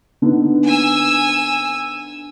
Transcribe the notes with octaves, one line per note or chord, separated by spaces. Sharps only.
D3 B3 D#4
G#5 E6